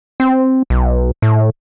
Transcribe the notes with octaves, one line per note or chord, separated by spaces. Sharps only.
C4
B1
A2